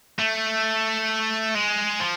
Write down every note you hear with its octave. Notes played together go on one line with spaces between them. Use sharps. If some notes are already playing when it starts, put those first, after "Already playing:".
A3
G#3
F3